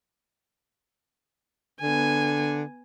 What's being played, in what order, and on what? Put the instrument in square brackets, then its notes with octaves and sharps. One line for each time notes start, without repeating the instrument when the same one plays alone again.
[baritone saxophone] D3 [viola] B3 G#5